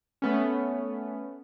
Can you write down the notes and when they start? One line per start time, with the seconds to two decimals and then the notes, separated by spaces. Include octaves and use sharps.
0.22 A3 B3 C#4